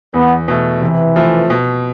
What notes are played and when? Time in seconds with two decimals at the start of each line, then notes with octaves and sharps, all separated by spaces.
0.14 E2 B3
0.48 B2 A3
0.81 C3 E3
1.16 F3 A3
1.50 B2